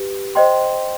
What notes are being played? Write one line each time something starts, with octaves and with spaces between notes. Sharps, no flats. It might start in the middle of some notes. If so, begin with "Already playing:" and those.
Already playing: G4 B4
C5 D#5 G5 C6